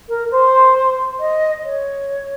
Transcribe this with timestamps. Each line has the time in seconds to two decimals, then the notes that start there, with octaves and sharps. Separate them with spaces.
0.08 A#4
0.31 C5
1.19 D#5
1.64 C#5